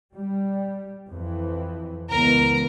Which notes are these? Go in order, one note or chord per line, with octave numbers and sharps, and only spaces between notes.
G3
F2 E3
C#2 E3 B3 A#4 A#5